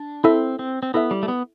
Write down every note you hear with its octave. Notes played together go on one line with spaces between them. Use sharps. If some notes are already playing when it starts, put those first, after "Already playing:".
Already playing: D4
C4 E4 A4 E5
C4
C4
B3 E4 A4 E5
G3
A3
B3